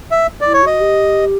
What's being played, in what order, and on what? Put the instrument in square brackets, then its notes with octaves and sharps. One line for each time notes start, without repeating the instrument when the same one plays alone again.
[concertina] E5
[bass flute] E4 [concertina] D5
[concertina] C#5
[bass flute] F#4 [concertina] D#5
[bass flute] G4